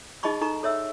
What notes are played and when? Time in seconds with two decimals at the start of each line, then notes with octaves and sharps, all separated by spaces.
0.23 D#4 G#4 D#5 A5 B5 C#6
0.41 D#4 A4 A#5 C#6
0.63 A4 C#5 E5 E6